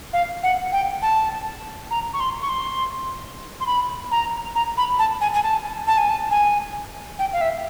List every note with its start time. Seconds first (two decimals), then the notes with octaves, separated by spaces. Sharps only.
0.13 F5
0.43 F#5
0.72 G5
1.02 A5
1.91 A#5
2.14 C#6
2.20 C6
2.42 C#6
2.49 C6
3.60 C6
3.66 B5
4.11 A#5
4.55 A#5
4.77 B5
4.99 A5
5.21 G#5
5.34 G#5
5.43 A5
5.87 A5
5.98 G#5
6.09 A5
6.31 G#5
7.19 G5
7.33 F5
7.41 E5